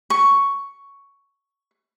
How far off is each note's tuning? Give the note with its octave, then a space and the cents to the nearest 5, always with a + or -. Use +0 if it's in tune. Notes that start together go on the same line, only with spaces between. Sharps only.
C#6 +5